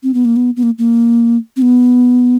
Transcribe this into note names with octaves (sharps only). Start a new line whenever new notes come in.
C4
B3
A#3
B3
B3
A#3
A#3
C4
B3